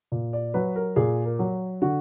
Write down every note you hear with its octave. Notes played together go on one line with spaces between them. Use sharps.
A#2
D5
F#3 B4
A#4
A#2 G#4
A#4
F#3
D3 F#4